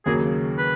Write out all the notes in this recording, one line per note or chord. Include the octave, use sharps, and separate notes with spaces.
D#2 C#3 F#3 A#3 G#4
B4